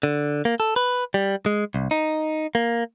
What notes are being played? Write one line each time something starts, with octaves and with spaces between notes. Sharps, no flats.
D3
A#3
A4
B4
G3
G#3
C2
D#4
A#3